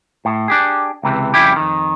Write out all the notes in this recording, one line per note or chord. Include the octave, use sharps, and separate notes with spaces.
A2
D4 G4 G#4
C#2 C3 E3
F2 C#3 G3 E4 G4
F2 D#3